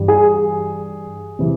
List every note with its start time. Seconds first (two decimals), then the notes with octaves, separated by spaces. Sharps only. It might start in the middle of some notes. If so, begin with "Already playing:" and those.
Already playing: G2 E3 G3
0.08 G#4 G#5
1.39 C3 E3